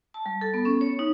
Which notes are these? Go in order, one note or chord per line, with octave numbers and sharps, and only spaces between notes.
A5
G3
A4
B3
C#4
C#5
D#4